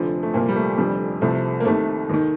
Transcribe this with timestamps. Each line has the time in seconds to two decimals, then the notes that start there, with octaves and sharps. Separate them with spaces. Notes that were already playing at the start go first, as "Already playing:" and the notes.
Already playing: F1 F2 D3 F3
0.23 A3
0.34 C2 A#2 F3 A#3
0.49 G3
0.56 A3
0.78 F1 F2 D3 G3
1.21 C2 C3 F3 A3
1.60 A#3
1.65 C2 C3 D#3 A3
2.10 D#2 D#3